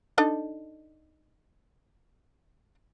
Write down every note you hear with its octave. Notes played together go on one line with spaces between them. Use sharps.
D4 D#4 A4